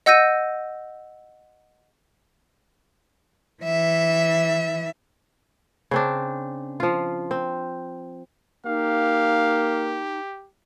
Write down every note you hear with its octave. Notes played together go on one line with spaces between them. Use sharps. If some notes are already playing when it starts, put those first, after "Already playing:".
D#5 F#5 E6 G6 A#6 D#7
E3 E5
C#3 C4 D4
F3 F4
C4
A#3 D#4 G4 F5